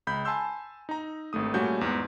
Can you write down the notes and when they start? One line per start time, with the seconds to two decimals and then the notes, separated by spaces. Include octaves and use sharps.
0.07 C#2 B5 G6
0.25 G#5 A5 B5 C6 E6 G6
0.89 D#4 A#5
1.33 G#1 G2 A3 D#6
1.54 A#2 G3 A3 C#4 F#4 G6
1.81 E2 G#2